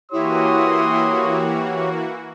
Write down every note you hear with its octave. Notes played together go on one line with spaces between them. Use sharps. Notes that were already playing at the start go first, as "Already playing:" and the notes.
E3 A#3 E4 F#4 G4 C#5 C6 D#6